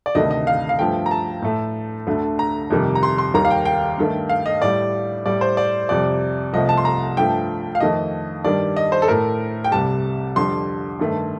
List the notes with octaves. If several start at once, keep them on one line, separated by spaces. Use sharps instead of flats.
D5
D2 C3 D#3 A3 D#5
D#5
F5
F5
G2 F3 A3 G5
A#5
A5
A2 A3
D2 D3 A3
A#5
F2 C3 D#3 G3
A#5
C6
C6
D#2 D#3 G3 A#5
F5
G5
G5
G2 D#3 A3
F5
D#5
A2 G3 D5
A2 G3 D5
C5
D5
F2 C3 G3 D5
C2 C3 F3 A3 D#5
A5
C6
A#5
G2 F3 A3 G5
F5
F2 D#3 A3 D#5
G2 D#3 G3 D5
D#5
C5
A4
A2 A3 A#4
G5
C2 C3 G3 A5
F2 D3 G3 C6
G2 D#3 A3